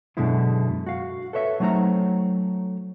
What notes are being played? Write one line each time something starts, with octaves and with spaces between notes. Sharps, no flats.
F#2 B2 D3 G#3 E4
F#4 F5
A4 B4 C#5 E5
F#3 A3 C4 D#4 C#5 A#5